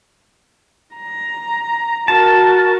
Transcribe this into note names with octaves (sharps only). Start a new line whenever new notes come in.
A#5
F#4 A#4 A5